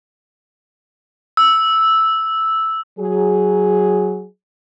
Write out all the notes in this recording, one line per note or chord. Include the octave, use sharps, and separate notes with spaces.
E6
F#3 G#4